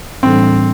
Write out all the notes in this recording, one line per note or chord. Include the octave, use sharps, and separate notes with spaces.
A2 E3 G3 C4 D4 A4